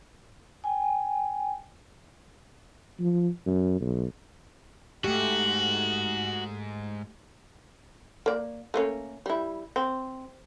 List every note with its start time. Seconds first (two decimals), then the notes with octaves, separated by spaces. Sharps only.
0.64 G5 G#5
3.00 F3
3.46 F#2
3.81 B1
5.04 G#2 A3 F#4 G4
8.26 A#3 D5
8.74 A3 A#3 C#4
9.26 G3 E4
9.76 C4